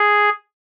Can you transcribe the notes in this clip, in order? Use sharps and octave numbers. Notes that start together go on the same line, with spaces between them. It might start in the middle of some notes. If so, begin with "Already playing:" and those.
Already playing: G#4